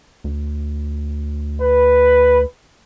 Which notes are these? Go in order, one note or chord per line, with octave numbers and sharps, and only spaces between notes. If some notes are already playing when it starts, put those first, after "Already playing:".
D2
B4